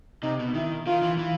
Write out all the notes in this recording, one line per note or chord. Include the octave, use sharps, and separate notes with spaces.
C3 D#4
B2
D#3 E4
D#3 F4
E3
E3